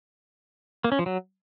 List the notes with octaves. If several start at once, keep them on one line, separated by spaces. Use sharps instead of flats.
A#3
C#4
F3
F#3